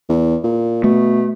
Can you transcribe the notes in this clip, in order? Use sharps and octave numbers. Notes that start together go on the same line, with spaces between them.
E2
A#2
B2 A3